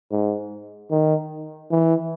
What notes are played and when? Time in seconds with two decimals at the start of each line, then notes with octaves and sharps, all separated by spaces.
0.11 G#2
0.91 D#3
1.71 E3